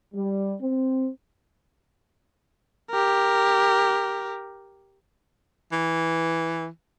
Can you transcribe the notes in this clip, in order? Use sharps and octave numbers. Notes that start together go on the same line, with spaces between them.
G3
C4
G4 A#4
E3